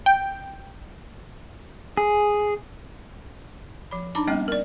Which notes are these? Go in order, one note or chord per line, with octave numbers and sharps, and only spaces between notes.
G5
G#4
F3 B5
D4 D#4 A5 B5 D6
G3 A#3 B3 C#4 D#5 G5
A#4 D5